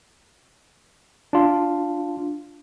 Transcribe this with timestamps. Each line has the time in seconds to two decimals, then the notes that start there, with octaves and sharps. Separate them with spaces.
1.33 D4 F4